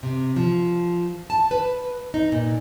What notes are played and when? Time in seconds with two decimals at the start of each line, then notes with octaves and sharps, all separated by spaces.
0.03 C3
0.36 F3
1.30 A5
1.51 B4
2.14 D#4
2.32 A#2